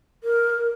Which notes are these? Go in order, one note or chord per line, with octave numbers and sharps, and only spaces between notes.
A#4